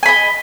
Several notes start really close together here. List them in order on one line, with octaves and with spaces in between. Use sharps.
G#5 B5 D#5